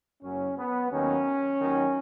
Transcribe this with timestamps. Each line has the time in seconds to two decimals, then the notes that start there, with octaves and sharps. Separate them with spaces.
0.23 F#1 F#2 F#3 C#4
0.57 B3
0.91 D#2 D#3 F#3 C#4
1.61 D#2 D#3 F#3